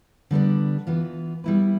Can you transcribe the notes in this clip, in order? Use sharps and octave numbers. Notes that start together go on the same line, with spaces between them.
D3 G3 B3 D4
E3 B3 F4 B4
G3 B3 E4 B4